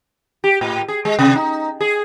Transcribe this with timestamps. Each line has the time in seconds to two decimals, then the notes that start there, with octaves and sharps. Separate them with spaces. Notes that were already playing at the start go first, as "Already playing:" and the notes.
0.44 G4
0.61 A2
0.88 G#4
1.05 G#3
1.19 C3
1.35 D#4
1.81 G#4